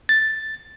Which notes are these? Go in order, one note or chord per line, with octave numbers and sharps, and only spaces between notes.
A6